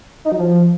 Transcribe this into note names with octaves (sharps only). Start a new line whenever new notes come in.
D#4
F#3
F3